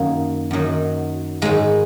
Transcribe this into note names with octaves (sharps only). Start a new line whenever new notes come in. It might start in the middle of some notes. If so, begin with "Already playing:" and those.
Already playing: F#2 D#3 F#3 A#3
F#2 D#3 F#3
G#2 D#3 F#3 G#3